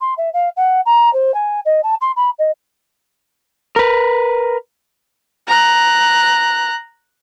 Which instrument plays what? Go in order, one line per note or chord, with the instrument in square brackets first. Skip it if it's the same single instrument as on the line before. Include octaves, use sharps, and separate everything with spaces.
[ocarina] C6
E5
F5
F#5
A#5
C5
G#5
D#5
A5
C6
B5
D#5
[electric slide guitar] A#4 B4
[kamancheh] A#5 F#6